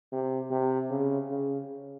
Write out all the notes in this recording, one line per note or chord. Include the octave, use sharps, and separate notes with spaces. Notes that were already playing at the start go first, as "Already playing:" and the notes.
C3
C3
C#3
C#3